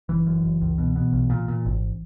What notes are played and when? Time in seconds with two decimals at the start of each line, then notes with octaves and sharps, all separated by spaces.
0.09 F#1 E3
0.27 F#2
0.43 F#1
0.61 C#2
0.78 B2
0.96 B2
1.13 B1
1.30 A#2
1.48 A#2
1.65 G#1